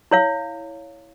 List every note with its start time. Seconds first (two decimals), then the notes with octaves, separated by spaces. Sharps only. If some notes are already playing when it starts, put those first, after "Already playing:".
0.11 E4 C#5 F5